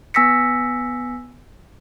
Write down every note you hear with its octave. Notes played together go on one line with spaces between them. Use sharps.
B3 G#5 E6 A#6 B6 C#7